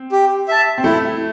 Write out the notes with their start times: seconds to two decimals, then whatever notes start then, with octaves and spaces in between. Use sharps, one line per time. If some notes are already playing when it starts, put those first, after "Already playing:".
Already playing: C4
0.12 G4
0.48 E5 A5
0.78 C4
0.84 A3 E4